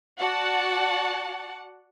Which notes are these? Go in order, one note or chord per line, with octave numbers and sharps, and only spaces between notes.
F#4 D5 F#5 A5